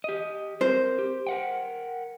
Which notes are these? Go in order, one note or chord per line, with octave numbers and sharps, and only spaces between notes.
G4 D#5
C4 A#4 C5
G4
A#4 F#5 G5